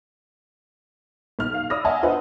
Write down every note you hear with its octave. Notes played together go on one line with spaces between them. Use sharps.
B1 F6
F5
D5 B5 D#6 E6 A#6
D#5 E5 F#5 G#5 A5
D4 F4 B4 C5 D#5 F#5